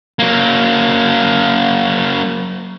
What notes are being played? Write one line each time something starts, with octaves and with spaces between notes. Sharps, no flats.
F#3 A#3